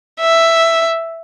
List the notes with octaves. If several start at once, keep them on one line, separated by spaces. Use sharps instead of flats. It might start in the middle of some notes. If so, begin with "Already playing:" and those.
E5